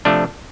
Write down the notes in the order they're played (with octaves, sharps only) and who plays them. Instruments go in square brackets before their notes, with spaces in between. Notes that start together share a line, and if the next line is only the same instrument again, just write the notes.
[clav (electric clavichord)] C3 F3 A3 D4